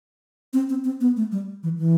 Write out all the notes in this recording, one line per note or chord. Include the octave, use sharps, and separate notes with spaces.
C4
C4
C4
B3
A3
G3
E3
E3